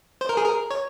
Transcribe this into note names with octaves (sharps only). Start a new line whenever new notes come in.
C5
A#4
G#4
A#4
C#5